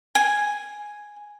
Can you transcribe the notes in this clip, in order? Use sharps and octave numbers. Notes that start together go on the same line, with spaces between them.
G#5